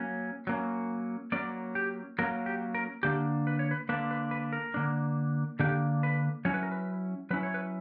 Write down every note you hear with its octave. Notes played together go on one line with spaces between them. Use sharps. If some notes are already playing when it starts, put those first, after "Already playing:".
Already playing: F#3 A#3 C#4
F#3 A#3 C#4
F#3 A#3 C#4 D5
G4
F#3 A#3 C#4 A#4
G4
A#4
D3 A#3 D4 G4
B4
C#5
B4
D3 A#3 D4 B4
B4
B4
A#4
D3 A#3 D4
D3 A#3 D4 G4
B4
F#3 C#4 E4 C#5
B4
A#4
B4
F#3 C#4 E4 B4
C#5
B4